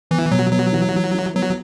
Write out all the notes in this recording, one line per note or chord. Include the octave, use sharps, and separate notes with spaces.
E3 B3
B2 F#3
F#3 B3
E3
E3
E4
F#3 B3